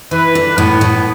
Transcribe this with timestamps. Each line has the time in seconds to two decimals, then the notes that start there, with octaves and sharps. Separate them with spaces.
0.11 E3 B4
0.35 D3
0.57 A2 B3
0.81 A2